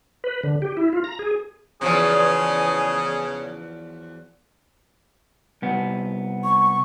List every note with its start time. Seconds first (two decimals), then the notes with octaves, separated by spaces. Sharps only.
0.24 B4
0.43 D3
0.62 G4
0.77 E4
0.93 F4
1.04 A#5
1.19 G#4
1.81 E2 C#3 F3 F#3 G#4
5.62 C2 B3
6.44 C#6